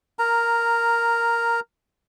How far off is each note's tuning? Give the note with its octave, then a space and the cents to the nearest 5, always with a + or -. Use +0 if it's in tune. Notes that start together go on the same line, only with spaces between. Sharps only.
A#4 +0 A#5 -10